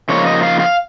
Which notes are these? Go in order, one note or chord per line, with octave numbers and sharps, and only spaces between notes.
C#3 F3 A#3 D#4 C#5
D#5
F5
F5